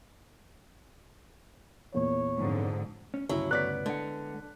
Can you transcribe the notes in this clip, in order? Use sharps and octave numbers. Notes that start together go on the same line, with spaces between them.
E2 A#2 C#5
F2 G#2 D3
C#4
D2 G2 C#3 F#3 C#4 E4
B3 D5 F#6 B6
D3 G#3 F#5